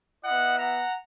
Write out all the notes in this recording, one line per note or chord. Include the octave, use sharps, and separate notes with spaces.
B3 E4 D#5 F#5
F#5 A#5